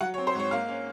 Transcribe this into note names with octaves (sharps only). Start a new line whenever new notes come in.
F#3 F#5
C#5
C4
C5
G#2 C#5
A#3 F5
C#4